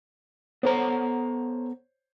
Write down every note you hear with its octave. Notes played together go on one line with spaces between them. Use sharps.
B3 A4 C5 C#5 A#5